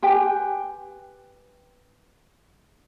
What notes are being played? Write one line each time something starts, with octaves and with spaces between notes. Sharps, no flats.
G4 B4 G5 G#5